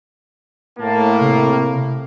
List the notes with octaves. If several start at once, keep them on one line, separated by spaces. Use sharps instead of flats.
A2 A#3 A5
C3